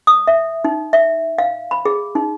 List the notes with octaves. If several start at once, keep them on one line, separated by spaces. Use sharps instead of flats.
D#6
E5
D#4
E5
F5
B5
G#4
D#4